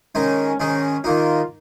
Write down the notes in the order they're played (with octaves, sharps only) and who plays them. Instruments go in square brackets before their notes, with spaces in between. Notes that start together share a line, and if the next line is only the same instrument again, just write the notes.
[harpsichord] G#2 D#3 G#3 D#4 [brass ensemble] C#4
[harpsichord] G#2 D#3 G#3 D#4 [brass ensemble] C#4
[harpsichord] D#3 A#3 D#4 [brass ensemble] F4